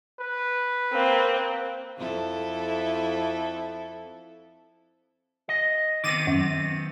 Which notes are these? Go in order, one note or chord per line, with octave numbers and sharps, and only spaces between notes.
B4
A#3 C4
F2 E4 A4
D#5
D#3 B3 C4 D6 A6 D#7
F#2